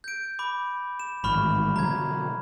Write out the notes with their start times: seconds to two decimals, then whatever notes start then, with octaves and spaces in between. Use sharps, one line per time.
0.04 G6 D7
0.39 B5 D6
1.00 E7
1.24 A1 G#2 D#3 B5 C#6 F6
1.76 B2 D3 F#3 A#5 G#6